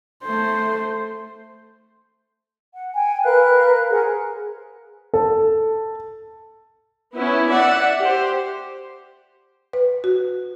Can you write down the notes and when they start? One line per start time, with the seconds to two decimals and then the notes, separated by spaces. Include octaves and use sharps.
0.24 A3 C5
2.74 F#5
2.95 G5 G#5
3.24 A#4 B4 F5 F#6
3.89 G#4 A#4 C5 F#5
5.14 A4
7.15 B3 C#4 E4
7.50 D5 E5 F#5
8.01 G4 C5
9.73 B4
10.04 F#4